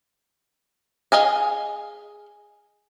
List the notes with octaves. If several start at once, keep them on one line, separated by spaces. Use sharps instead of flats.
G#4 D#5 F5 G#5